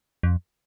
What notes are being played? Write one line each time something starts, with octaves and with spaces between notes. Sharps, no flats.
F2